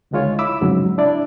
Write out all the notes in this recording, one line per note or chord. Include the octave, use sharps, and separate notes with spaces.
C#2 D3 D#3 G#3 F4 C#5
E4 B5 D6 E6
F2 G#2 C#3 F#3
D4 E4 D5